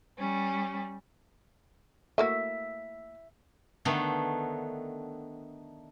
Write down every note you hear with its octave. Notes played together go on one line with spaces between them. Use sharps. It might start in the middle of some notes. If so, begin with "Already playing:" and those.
G3 C#4
A3 A#3 F#4 E5
D3 D#3 A3 B3